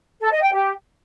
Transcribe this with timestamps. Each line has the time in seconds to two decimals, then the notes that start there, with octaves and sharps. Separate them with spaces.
0.20 A4
0.31 D#5
0.41 G5
0.52 G4